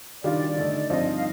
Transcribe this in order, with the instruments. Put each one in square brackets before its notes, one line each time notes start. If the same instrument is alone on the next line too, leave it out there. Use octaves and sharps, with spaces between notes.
[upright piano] D#3 G3 D4 F4 [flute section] D5
[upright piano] D3 A3 D#4
[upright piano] G2 F3 C4 D#4 [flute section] D#5
[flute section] F5